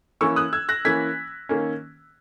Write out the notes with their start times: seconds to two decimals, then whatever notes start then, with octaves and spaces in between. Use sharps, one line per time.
0.21 E3 A#3 C#4 C#6 E6
0.36 D#6 F#6
0.53 E6 G#6
0.69 F#6 A#6
0.85 E3 A#3 C#4 G#6 B6
1.49 D#3 A#3 C#4